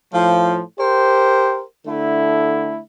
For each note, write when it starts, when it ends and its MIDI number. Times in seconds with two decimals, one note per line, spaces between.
0.14 0.62 45
0.14 0.62 53
0.79 1.63 67
0.79 1.63 70
0.79 1.63 72
1.87 2.80 50
1.87 2.80 57
1.87 2.80 64